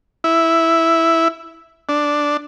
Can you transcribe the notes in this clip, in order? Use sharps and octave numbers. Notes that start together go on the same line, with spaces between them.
E4
D4